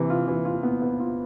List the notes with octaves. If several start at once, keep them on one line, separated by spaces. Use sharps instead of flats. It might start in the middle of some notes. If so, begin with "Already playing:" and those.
Already playing: C3 E3
F4
E3
F4
B3
B3
F4